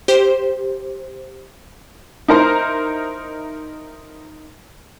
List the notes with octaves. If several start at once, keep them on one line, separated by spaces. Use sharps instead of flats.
G4 C5
D#4 E4 A#4 C5 A#5